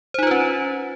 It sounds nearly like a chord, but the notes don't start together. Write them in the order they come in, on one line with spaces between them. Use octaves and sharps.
C5 D#4 F4 B4 C#4